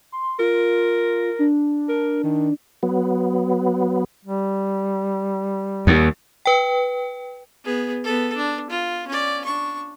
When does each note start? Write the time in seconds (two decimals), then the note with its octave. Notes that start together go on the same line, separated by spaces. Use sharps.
0.12 C6
0.40 F4 A#4
1.39 D4
1.89 A#4
2.24 D#3
2.83 F#3 B3
4.25 G3
5.87 D#2
6.46 B4 G5
7.64 B3 G#4
8.04 B3 A4
8.36 D4
8.70 F4
9.08 C#4 D5
9.45 D4 C#6